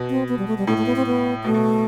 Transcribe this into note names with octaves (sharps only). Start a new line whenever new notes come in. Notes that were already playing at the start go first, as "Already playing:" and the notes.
Already playing: B2
C4
B3
G3
A3
G3
A2 A3
A3
B3
C4
B3
B2 A3
B2